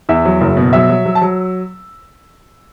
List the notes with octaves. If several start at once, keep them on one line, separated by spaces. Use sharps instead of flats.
E2 E5 E6
F#3
F#1
B2
F#3 E5 E6
F#3
F#3
A5
F#3